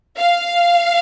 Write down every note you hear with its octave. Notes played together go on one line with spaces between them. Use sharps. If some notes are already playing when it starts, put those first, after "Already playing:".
F5